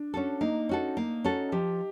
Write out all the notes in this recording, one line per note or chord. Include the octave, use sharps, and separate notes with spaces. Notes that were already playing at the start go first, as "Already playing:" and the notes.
Already playing: D4
C#4 F#4 A4
A#3 D#4
C#4 F#4 A4
A#3
C#4 F#4 A4
F3 G4